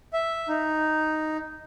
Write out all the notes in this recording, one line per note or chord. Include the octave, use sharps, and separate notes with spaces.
E5
D#4